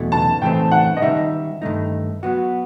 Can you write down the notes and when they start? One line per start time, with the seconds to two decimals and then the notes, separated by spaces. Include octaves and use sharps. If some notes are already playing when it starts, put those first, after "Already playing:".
Already playing: E2 B2 F#3 A3 E4
0.12 A5
0.42 A2 E3 A3 C4 D#4 G5
0.72 F#5
0.97 D#5
1.02 D#3 G3 D#4 E5
1.62 G2 D#3 A3 D#4
2.23 F#3 B3 F#4